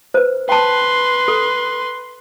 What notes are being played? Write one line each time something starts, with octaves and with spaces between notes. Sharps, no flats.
B4 C5
B4 G5 A5 C6
A4